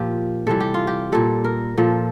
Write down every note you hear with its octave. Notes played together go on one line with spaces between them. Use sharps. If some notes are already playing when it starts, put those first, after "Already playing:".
Already playing: A#2 F3 G4
C3 E3 G3 A4
G4
F4
G4
A#2 G3 A4
A#4
A#2 F3 A4